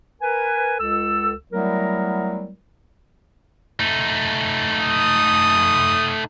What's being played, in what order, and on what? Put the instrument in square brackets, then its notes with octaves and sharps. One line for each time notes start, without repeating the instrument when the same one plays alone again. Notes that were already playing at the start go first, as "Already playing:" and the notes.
[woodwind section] A#4 B4 G#5
C#2 A4 E6
F#3 G3 A3 B3 E4 A#4
[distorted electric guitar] A3 D#4
[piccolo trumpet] D#6